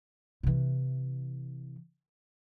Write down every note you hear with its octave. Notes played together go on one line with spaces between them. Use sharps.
C3 E3